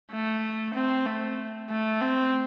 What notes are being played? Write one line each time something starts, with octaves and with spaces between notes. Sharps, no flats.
A3
C4
A3
A3
C4